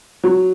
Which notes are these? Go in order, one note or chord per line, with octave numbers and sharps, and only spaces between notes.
F#3